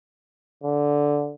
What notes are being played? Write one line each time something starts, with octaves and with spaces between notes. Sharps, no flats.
D3